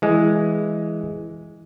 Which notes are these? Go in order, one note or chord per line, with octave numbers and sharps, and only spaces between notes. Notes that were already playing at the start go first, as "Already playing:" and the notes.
E3 G#3